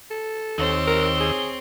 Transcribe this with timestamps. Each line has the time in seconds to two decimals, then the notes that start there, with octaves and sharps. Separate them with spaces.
0.11 A4
0.58 D#2 C4 C#5 E6
0.87 A#4
1.20 G#4